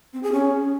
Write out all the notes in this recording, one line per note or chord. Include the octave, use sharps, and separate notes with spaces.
C4
G#4
C#4